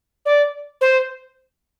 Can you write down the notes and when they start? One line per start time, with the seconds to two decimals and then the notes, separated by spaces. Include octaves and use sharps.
0.26 D5
0.81 C5